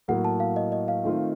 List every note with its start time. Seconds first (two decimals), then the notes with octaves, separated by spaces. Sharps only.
0.08 A2 F#3 A#3 F#5
0.25 A5
0.40 F5
0.56 D#5
0.72 D#5
0.88 F5
1.04 D#3 A3 C4 F4